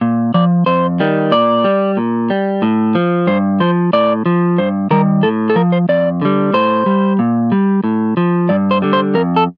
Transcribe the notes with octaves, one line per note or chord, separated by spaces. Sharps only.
A#2
F3 D5
F2 C5
D#3 G3
A#2 D5
G3
A#2
G3
A2
F3
G2 C5
F3 C5
A2 D5
F3
G2 C5
D#3 G3 A#4
A2 A4
A4
F3 A#4
C5
F2 D5
D3 G3
A2 C5
G3
A#2
G3
A2
F3
G2 D5
C5
D3 G3
C5
F2 A#4
A4